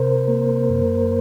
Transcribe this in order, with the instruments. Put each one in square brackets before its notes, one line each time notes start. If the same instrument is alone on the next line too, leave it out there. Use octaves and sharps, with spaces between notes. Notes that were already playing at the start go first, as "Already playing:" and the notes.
Already playing: [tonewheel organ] C3 A#4 C5
A#3
F#2